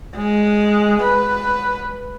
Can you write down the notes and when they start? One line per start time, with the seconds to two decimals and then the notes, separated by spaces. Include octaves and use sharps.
0.16 G#3
1.02 B4